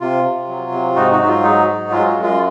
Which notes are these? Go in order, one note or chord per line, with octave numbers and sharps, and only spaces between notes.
C3 F4
C3
F#3
C3
G#2 D#4 F#4
D#4 F#4
F#3
F4
G#2 D#4
F#3
G#3 F4
F4
F#2
F4